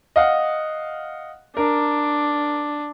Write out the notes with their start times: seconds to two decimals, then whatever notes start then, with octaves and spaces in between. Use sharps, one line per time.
0.16 D#5 F5 F#5
1.57 D4 A#4